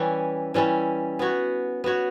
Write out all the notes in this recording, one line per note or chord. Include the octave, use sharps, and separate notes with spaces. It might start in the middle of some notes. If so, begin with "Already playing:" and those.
Already playing: E3 G3 C#4 E4
E3 G3 C#4 E4
B3 F#4 C#5
B3 F#4 C#5